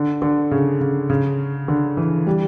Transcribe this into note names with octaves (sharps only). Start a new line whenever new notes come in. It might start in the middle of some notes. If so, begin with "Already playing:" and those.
Already playing: D3
D3
C#3
C#3
C#3
D3
E3
G3